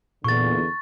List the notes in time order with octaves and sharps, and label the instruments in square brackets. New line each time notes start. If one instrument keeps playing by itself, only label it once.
[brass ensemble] E2 D3 [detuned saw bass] A#2 [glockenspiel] C#6 A6